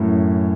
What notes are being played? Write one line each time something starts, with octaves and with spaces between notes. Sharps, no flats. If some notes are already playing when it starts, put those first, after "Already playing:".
Already playing: F#2 A2